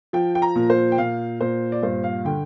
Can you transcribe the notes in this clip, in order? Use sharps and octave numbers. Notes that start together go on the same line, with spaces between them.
F3 G5
G5
A#5
A#2
C5
G5
A#2 F5
A#2 C5
D5
G2 C5
F5
D3 G5